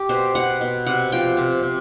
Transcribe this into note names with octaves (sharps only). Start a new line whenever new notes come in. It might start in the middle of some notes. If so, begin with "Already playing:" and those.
Already playing: G4
B2 C5
B2 F#5
B2
C3 F#5
F3 G5
C3
C3